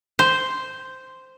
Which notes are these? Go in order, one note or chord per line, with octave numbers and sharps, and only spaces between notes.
C5